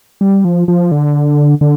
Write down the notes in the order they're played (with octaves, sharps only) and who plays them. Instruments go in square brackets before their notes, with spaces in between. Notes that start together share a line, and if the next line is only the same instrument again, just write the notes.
[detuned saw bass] G3
F3
F3
D3
D3